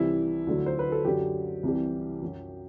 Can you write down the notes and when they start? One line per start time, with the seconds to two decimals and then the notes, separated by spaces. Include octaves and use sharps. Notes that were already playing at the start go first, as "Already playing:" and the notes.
Already playing: C2 C3 E3 G3 E4
0.47 D2 D3 F#3
0.66 C5
0.79 B4
0.92 A4
1.05 F#2 D3 F#3 G4
1.63 C2 C3 E3 G3
2.22 F#2 F#3